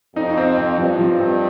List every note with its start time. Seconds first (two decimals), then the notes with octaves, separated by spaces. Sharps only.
0.16 F2 D#4
0.37 C4
0.57 C4
0.78 G2 F3
0.99 F3
1.09 G2
1.20 C4